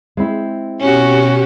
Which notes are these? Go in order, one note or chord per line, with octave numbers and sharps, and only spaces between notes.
G#3 C4 E4
B2 C#4 F#4 G4